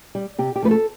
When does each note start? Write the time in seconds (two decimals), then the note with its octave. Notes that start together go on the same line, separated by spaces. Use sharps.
0.15 G3
0.38 C3 G4
0.56 G4
0.62 F3 A3 B4
0.71 A4